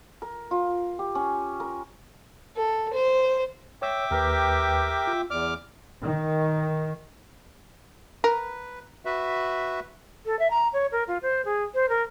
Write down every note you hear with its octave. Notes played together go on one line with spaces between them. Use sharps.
A#4
F4
G4
C#4
A#4
A4
C5
C#5 E5 G5 D6 E6
D#2 G4 A#4 B4
F4
E2 D5 D6 F6
D#3
A#4 B4
F#4 B4 E5
A4
E5
A#5
C#5
A#4
F4
C5
G#4
C5
A#4